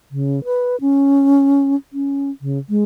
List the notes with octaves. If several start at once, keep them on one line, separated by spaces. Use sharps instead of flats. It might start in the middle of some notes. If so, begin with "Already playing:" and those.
C#3
B4
C#4
C#4
C#3
G#3